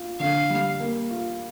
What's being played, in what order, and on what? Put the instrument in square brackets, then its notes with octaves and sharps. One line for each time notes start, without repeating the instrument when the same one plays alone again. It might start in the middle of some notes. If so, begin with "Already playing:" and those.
Already playing: [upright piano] F4
[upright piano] D3 [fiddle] F5
[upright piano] G3
A#3
F4